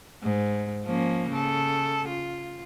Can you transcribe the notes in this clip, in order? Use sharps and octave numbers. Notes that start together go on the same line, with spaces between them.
G#2
F3 A#3 C#4
C#3 A4
F4